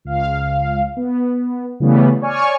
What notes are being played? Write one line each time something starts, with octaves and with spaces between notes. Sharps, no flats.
C#2 F5
B3
C#3 E3 G3 A3 B3 C#4
C#5 D5 G#5 C#6 F6